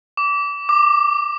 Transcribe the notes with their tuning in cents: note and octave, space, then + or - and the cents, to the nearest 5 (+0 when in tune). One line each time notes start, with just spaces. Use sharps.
D6 -25
D6 +15